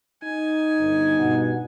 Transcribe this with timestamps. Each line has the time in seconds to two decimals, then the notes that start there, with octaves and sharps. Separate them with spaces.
0.24 D#4 G#5
0.78 G1
1.18 G2 B2 F#5